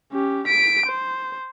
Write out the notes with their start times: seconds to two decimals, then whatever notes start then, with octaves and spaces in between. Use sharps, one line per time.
0.12 C#4 G4
0.47 B6 D7
0.87 C5